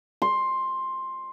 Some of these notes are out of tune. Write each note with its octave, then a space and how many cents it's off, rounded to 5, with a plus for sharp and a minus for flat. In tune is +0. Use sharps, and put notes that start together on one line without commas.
C6 +10